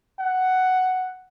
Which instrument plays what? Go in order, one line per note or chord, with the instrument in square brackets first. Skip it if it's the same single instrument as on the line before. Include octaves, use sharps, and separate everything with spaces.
[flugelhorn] F#5